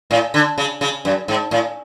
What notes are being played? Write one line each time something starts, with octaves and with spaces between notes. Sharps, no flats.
A2
D3
C#3
C#3
F#2
G#2
A2